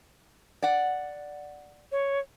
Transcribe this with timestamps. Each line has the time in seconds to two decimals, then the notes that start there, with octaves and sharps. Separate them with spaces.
0.62 D5 F#5
1.92 C#5